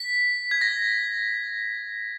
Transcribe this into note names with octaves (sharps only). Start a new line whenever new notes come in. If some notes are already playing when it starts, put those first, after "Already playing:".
Already playing: B6
G#6
A#6